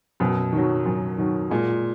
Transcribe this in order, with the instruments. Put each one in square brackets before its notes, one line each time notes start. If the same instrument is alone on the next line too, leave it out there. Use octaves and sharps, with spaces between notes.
[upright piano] F#2 [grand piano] B2
[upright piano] D#3 F#3
F#2
D#3 F#3
[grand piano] A#2 [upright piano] G#3